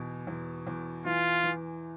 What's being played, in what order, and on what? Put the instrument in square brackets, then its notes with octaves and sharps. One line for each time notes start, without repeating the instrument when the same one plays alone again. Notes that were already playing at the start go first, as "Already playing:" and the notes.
Already playing: [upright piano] E2 B2
E2
E2
[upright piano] E3 [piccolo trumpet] F4
[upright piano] E3